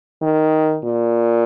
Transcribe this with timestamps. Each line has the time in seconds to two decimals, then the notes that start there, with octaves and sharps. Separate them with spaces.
0.22 D#3
0.84 A#2